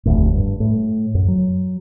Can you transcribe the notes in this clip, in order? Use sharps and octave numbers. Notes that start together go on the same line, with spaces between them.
F1 D2 A2
G2
A2
F#2
F#3